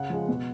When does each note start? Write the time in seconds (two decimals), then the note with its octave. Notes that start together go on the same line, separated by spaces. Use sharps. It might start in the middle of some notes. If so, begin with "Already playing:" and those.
Already playing: C#3 F#5
0.10 F3 G#3
0.29 B2